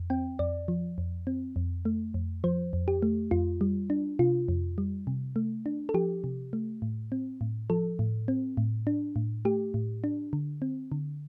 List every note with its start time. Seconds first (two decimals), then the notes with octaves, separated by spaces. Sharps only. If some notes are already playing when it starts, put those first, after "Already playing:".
Already playing: F2
0.10 C4 G5
0.39 F2 D5
0.68 F3
0.98 F2
1.27 C4
1.56 F2
1.85 A3
2.14 F2
2.44 F3 C5
2.73 F2
2.88 G4
3.02 A3
3.31 F2 F4
3.61 G3
3.90 D4
4.19 C3 F4
4.48 F2
4.78 G3
5.07 C3
5.36 A3
5.66 D4
5.89 A4
5.94 F3 G4
6.24 C3
6.53 A3
6.82 A2
7.12 C4
7.41 A2
7.70 F3 A4
7.99 A2
8.28 C4
8.57 A2
8.87 D4
9.16 A2
9.45 A3 G4
9.74 A2
10.04 D4
10.33 D3
10.62 C4
10.92 D3